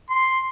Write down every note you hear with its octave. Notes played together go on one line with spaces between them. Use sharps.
C6